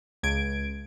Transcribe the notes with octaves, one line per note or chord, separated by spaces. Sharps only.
C#2 G#6 D7